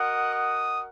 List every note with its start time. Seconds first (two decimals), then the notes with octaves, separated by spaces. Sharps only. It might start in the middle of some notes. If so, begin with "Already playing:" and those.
Already playing: F#4 A#4 D#5 F#5 D#6
0.34 D#6